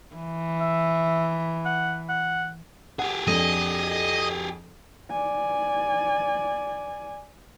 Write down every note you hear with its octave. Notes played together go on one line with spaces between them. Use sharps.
E3
E5
F#5
F#5
G4 G#4 F#5
F2 D4 D#5
D5 G#5